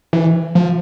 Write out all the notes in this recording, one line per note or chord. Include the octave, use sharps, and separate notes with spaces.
E3
F3